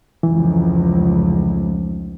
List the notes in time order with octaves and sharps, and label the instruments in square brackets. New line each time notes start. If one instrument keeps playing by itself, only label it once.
[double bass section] F1 C#2 [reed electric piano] E3